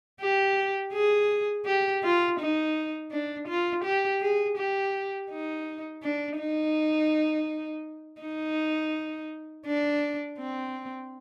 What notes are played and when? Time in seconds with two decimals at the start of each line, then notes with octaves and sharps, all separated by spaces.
0.21 G4
0.93 G#4
1.66 G4
2.03 F4
2.39 D#4
3.11 D4
3.47 F4
3.84 G4
4.21 G#4
4.57 G4
5.30 D#4
6.03 D4
6.39 D#4
8.21 D#4
9.66 D4
10.39 C4